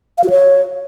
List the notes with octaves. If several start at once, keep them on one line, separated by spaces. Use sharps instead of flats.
F5
F#4
C#5